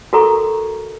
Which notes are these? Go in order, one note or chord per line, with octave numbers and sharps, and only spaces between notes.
F#4 A4 A#4 A#5 C#6